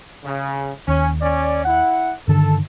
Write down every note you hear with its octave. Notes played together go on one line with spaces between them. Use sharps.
C#3
D#2 C#4
C#4 D5
E4 F#5
G2 D3 D#3 A4 A5